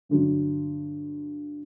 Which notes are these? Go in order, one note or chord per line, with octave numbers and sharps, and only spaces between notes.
G2 D3 F#3